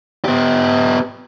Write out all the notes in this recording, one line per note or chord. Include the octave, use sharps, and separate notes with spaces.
B3 G4